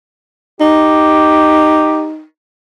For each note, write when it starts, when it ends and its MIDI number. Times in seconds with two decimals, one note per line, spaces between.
0.61 2.24 63
0.61 2.07 67